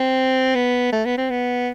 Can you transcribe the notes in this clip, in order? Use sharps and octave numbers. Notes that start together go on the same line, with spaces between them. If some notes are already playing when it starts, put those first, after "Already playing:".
Already playing: C4
B3
A3
B3
C4
B3